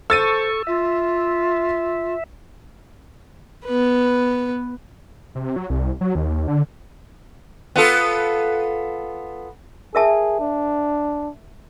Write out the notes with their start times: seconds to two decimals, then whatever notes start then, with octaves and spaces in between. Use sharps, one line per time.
0.10 A4 C5 C#6 E6 A6 D#7
0.67 F4 E5
3.66 B3 B4
5.35 C3
5.56 F#3
5.70 C2
6.01 F#3
6.15 D#2
6.48 D3
7.76 B3 F4 A4
9.95 G#4 A#4 E5 A5
10.40 D4